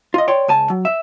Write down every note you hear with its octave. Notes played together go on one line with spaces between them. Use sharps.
F4 D#5
C#5 D5 G5 C6
C#2 G#5 A5
F#3
E5